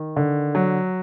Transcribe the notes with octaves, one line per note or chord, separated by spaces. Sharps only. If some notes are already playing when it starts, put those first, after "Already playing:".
Already playing: D#3
D3
F#3